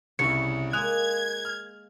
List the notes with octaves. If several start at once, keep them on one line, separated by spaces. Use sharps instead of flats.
C2 C#3 E4 C#5 C#7
G#3 A#3 D#6 F#6 G#6 F7
F6